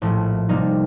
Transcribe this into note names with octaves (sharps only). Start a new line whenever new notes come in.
A#1 A2 F3 A3
C3 G3 A#3 D#4 A4